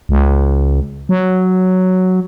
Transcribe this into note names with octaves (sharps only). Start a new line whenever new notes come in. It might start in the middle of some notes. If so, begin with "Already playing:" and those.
C#2
F#3